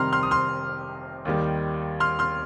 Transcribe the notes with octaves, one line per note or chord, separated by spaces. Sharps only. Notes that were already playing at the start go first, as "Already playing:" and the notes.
Already playing: F1 F2 C3 D#3 G3 A#5 C6 F6
C6 F6
D#6
C6 F6
D#2 D#3 G3
C6 F6
C6 F6